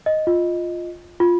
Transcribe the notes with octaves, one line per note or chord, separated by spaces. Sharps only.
D#5
F4
F4